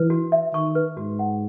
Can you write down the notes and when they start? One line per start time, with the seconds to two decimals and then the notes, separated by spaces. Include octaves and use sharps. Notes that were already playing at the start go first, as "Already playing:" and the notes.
Already playing: E3 B4
0.10 F#4
0.32 E5
0.54 D#3 C#6
0.75 B4
0.97 G#2 F#4
1.19 F#5